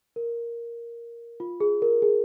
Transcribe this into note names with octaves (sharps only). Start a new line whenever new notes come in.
A#4
F4
G#4
A#4
G#4